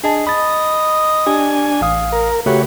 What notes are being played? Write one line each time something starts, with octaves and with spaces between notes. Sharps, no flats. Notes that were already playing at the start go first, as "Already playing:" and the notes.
D4 G#4 D#5 A5
D#5 B5 A6
D4 G4 G#5
A1 F5 D#6
A#4
C#3 A3 F#4 G4 B4 C#5